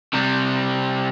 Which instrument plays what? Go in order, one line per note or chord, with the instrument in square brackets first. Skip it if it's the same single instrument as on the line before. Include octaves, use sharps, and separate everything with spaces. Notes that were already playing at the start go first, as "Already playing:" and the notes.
[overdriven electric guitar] C3 G3